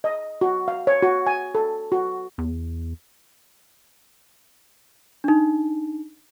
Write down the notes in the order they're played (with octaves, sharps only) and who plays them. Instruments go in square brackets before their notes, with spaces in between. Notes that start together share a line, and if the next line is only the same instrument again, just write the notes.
[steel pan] D#5
F#4
F5
C#5
F#4
G#5
A4
F#4
[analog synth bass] E2
[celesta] D4 D#4